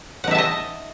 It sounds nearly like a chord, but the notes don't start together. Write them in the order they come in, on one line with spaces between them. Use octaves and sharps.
F#5 D#4 E5 A5 D#5